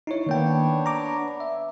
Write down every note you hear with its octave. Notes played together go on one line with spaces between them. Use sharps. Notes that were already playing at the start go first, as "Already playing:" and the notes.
D#4 E4 C#5
D#3 A#3 B3 D4 C#5 G5
A#5 D6
E5